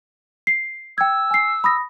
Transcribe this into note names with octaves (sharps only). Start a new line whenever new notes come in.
C7
G5 E6 G#6
G#5 C7
B5 D#6 A#6